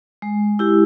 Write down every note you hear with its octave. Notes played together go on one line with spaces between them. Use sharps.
G#3
E4 G4